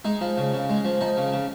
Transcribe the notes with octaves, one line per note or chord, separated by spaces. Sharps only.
G#3 D#4
F3
C#3
C#3
G#3
F3
F3 D#4
C#3
C#3